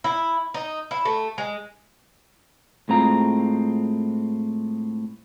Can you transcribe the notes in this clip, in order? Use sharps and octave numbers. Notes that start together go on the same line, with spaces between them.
E4
D#4
E4
A3
G#3
A2 G#3 C4 F4 A#5